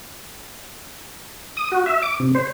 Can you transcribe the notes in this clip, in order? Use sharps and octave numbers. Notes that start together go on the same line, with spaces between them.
D#6
F#4
E5
D6
C3
C5